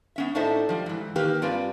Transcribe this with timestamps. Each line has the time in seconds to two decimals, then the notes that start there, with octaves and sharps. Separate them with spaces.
0.16 B3 C#4 E5
0.35 A2 D4 D#4 A4 C5 E5
0.69 F3 G3
0.86 G#2 E3
1.16 D#3 A#3 D#4 G4 A#4 B4
1.42 G2 G3 C4 F4 B4 G#5